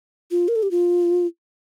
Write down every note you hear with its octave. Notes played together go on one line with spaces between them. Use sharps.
F4
A#4
A4
G4
F4